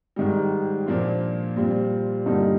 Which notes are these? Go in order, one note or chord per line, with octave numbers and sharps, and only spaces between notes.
G#2 D#3 G3
A#2 F3 A#3 D4 F4
A#2 G3 C4 F4
G2 D3 G3 A#3 D#4